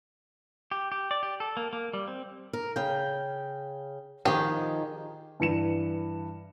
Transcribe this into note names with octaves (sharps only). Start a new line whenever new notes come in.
G4
G4
D5
G4
A4
A#3
A#3
G3
C4
A#4
C#3 G5
D#3 F3 G4 G#4
G2 E3 C#7 E7